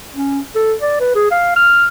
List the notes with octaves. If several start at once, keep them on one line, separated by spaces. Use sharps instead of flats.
C#4
A4
D5
B4
G#4
F5
F6